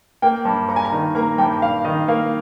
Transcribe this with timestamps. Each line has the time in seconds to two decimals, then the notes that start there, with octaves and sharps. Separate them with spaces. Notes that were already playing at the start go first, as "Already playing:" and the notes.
0.22 A#3 G5
0.45 G2
0.69 G2 A#5
0.76 G#5
0.85 A#5
0.92 D#3
1.15 A#3 A#5
1.38 G2 G5
1.61 G2 F5
1.85 D#3 D#5
2.08 A#3 F5